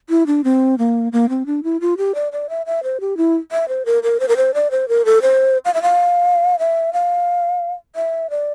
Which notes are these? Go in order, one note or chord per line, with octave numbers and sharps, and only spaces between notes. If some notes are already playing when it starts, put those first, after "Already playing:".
E4
D4
C4
A#3
A#3
C4
D4
E4
F4
G4
D5
D5
E5
E5
C5
G4
E4
E5
C5
A#4
A#4
C5
A#4
C5
D5
C5
A#4
A4
C5
F5
E5
F5
E5
F5
E5
D5